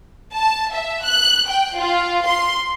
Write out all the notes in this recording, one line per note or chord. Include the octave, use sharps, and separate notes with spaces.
A5
E5
F#6
G5
F4
C6